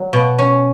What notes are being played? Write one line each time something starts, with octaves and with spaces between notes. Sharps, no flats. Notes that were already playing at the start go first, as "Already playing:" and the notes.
Already playing: F#3
B2
C#4